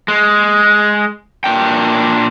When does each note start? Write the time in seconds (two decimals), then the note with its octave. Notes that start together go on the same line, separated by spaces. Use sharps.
0.08 G#3
1.44 A#2 D4 G5